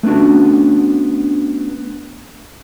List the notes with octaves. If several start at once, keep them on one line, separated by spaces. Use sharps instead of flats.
A3 B3 C#4 D4 F#4